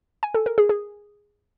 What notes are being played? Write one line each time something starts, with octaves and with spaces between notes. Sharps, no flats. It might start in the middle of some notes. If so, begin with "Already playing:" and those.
G#5
A4
A#4
G#4
G#4